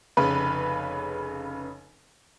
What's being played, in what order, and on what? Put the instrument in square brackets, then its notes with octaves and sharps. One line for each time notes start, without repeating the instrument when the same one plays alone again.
[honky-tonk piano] F1 C#3 B4